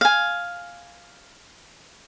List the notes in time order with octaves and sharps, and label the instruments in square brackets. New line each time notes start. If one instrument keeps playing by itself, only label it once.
[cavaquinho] F5 G#5